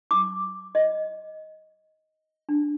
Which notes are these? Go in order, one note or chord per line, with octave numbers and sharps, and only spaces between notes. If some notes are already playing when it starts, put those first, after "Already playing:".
D6
D#5
D4